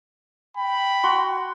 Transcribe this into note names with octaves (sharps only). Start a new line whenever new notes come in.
G5 B5
F#4 C6